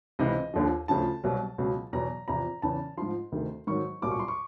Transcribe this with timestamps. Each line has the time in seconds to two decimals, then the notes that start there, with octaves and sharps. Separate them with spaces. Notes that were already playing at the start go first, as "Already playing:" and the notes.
0.19 C#2 C3 E3 D#5
0.54 D#2 D3 F3
0.88 D2 C#3 F3 A5
1.24 C2 B2 F#3
1.58 C#2 B2 F#3
1.93 E2 B2 F#3 A#5
2.28 E2 C3 F3 A#5
2.62 E2 C#3 E3 A5
2.97 G#2 F3 C6
3.32 D2 C3 D#3
3.67 G#2 D#3 F#3 C#6
4.02 C2 A#2 F#3 D6
4.11 C#6
4.19 C6
4.28 C#6